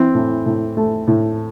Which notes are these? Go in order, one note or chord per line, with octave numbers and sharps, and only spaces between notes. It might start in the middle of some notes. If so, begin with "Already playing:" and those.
Already playing: E3 C4
A2
A2
A3
A2